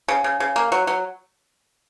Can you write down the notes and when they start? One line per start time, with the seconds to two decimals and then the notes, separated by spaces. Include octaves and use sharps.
0.08 C#3
0.24 C#3
0.40 C#3
0.56 A#3
0.72 F#3
0.87 F#3